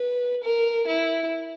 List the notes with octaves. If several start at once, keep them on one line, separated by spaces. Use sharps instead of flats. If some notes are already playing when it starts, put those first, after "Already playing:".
Already playing: B4
A#4
E4